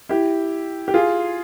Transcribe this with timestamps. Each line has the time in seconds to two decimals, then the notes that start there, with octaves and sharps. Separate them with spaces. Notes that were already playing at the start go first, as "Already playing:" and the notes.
0.09 E4 G4
0.88 G4
0.94 F4 G#4